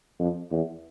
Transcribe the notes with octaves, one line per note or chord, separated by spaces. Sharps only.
F2
E2